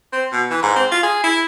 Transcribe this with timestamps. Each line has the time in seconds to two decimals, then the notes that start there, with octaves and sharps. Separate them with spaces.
0.13 C4
0.32 B2
0.50 E3
0.63 G#2
0.76 C4
0.91 F4
1.03 G#4
1.24 E4